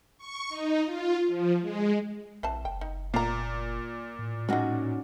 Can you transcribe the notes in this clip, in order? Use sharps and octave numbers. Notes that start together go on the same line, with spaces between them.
C#6
D#4
F4
F3
G#3
A#1 E3 C4 A5
F#1 G5
D#4
A#2 F5 A#5
A2
F#3 G#3 C#4 D#4 F#4